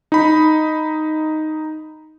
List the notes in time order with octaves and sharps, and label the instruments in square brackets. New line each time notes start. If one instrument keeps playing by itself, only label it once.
[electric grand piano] D#4 B5